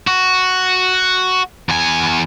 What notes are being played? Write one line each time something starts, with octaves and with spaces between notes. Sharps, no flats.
F#4
E2 G#5